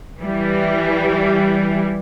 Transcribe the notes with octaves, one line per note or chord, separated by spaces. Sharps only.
E3 G3